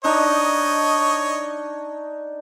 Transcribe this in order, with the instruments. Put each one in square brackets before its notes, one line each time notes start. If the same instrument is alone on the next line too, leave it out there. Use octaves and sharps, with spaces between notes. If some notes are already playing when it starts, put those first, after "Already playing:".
[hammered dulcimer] D4 D#4 [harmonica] C#5 D#5